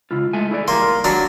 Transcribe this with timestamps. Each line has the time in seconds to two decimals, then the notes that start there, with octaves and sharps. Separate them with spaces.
0.11 C#2 E4 F4
0.33 G#3 A3 G#5
0.51 E4 G#4 D5
0.68 G3 A#3 C6
0.83 A#4
1.04 F#3 D4 A#5